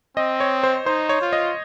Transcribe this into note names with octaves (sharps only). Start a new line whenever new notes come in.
C4 D#5
C#5
C5
D#4 C5
C#5
F4
D#5